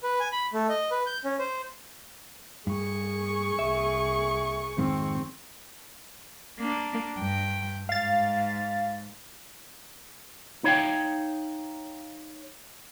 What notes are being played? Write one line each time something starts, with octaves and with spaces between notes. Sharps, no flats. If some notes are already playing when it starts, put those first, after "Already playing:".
B4
G#5
B5
A3
D#5
B4
G6
C#4
C5
G2 G#4 C#6
C2 E5
F2 G#2 D#3 C4
A#3 D4
G2 G5
G#2 F5 A6
D#4 C#5 F5 G5